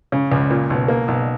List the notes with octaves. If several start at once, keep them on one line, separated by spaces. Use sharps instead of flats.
C#3
C#2
A#2
B1
A#3
B1